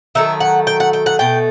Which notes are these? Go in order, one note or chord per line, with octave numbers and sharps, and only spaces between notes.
D#3 F#3 A3 E5
F#5
G5
F#5
G5
F#5
B2 A3 G5